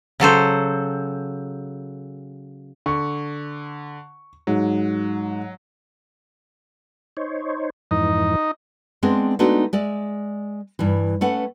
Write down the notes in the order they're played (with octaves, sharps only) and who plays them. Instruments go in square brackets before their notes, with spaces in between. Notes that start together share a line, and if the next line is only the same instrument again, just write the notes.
[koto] C#3 F#3 A4 C5
[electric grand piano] D3 [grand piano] C#6
[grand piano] G#2 [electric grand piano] F#3
[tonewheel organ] D#4 C5 C#5
[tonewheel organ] F2 G#2 E3 [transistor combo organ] D#4
[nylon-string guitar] G#3 B3 C4 D4 G#4
G#3 A3 B3 D4 D#4 F#4
G#3 D5 E5
G2 E3
A3 C#4 B4 F#5